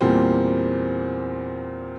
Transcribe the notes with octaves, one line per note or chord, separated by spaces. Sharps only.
E2 A#2 G3 A#3 C4